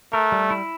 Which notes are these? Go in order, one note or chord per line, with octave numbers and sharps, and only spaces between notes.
A3 A#4
G3
E4